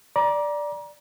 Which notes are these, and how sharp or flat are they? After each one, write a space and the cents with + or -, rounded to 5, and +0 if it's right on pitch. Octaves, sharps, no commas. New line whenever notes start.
D5 +0 A#5 +30